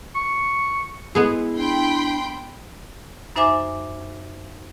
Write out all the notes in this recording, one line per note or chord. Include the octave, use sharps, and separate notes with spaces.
C#6
G#3 B3 E4 G#4
D4 G5 B5 C6
F#2 D#4 C5 E5 G#5 D6